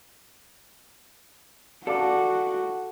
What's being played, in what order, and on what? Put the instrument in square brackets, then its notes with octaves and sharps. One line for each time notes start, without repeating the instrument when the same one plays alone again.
[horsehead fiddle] F#4 [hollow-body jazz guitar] A4 [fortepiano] D5 F5 D6